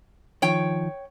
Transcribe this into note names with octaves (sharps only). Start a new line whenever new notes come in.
D#3 F3 C#5 G5